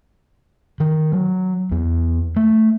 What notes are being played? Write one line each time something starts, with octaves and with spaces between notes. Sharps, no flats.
D#3
F#3
E2
A3